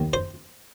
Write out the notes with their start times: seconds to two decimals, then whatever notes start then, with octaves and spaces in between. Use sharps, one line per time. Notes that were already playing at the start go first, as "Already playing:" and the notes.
Already playing: D#2 D#3
0.13 C5